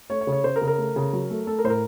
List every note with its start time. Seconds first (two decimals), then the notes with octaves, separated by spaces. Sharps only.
0.10 A3 C#5
0.21 C#5
0.27 C#3
0.32 C#5
0.44 C#3 C5
0.56 A#4
0.61 C#3
0.68 A#4
0.78 A3
0.96 C#3
1.13 F#3
1.30 A3
1.47 A3 A4
1.58 A#4
1.64 A2 C5
1.70 A#4